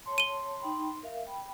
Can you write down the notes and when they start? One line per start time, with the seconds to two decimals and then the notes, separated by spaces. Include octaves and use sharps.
0.06 C#5 A5 C6
0.18 D#7 G7
0.60 D#4 G5 B5
1.03 A#4 E5 F5
1.26 G5 B5